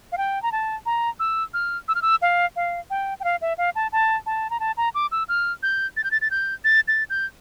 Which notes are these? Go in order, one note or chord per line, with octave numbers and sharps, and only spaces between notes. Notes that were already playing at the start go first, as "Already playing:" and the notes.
F5
G5
A#5
A5
A#5
E6
F6
E6
F6
E6
F5
F5
G5
G5
F5
E5
F5
A5
A5
A5
A#5
A5
A#5
D6
E6
F6
G6
A6
G6
A6
A6
G6
A6
A6
G6